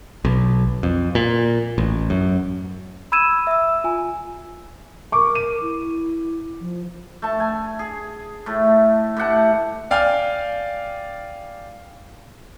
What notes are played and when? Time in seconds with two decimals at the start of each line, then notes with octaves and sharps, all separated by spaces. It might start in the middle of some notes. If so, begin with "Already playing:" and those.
0.25 B1
0.83 F2
1.15 A#2
1.78 A1
2.10 F#2
3.12 B5 E6 G#6 D#7 E7
3.47 E5 E6
3.84 F4 G#5
5.12 A#4 C#6 D6
5.35 D#7
5.62 E4
6.61 F3
7.22 A3 A5
7.40 G#5
7.79 G#4
8.46 A2 A3
9.17 A2 G4 F#5 A5
9.91 D5 F5 G5 G#5 F6